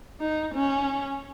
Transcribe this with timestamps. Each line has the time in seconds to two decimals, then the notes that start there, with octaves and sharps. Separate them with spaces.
0.20 D#4
0.55 C#4